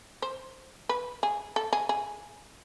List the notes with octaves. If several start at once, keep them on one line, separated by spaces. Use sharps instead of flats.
C5
B4
G#4
A4
G#4
G#4